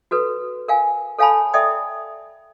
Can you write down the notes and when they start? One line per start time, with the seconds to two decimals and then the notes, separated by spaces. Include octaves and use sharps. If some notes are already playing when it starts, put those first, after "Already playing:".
0.11 F#4 A4 B4
0.68 A#4 F5 G#5
1.19 A4 C#5 F5 G#5 A5 B5
1.54 A4 D5 E5 G5 D#6